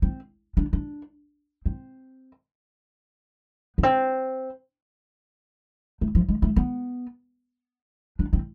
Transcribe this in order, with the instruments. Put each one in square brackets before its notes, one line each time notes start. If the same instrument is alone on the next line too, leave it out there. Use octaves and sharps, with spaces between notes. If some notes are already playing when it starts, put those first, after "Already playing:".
[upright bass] C4
D4
D4
C4
B3
C4
A3
F3
G#3
A3
B3
D4
C4